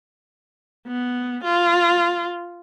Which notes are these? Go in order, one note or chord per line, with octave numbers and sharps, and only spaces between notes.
B3
F4